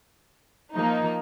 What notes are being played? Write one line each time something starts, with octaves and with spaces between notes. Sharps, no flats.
F3 A#3 D#4